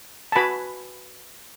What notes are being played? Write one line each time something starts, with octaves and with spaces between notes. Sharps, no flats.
A5
F#4 B4 G#5 B5